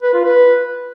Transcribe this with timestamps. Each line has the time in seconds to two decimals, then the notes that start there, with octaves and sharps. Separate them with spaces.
0.03 B4
0.14 F4
0.25 B4